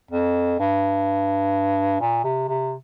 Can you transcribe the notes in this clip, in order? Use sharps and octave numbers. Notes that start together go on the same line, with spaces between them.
F2
G2
A#2
C3
C3